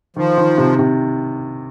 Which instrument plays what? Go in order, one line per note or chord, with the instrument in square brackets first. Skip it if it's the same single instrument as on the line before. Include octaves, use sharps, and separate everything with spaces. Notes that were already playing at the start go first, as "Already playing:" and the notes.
[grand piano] D#3 [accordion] F3
[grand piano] D#3
C3
C3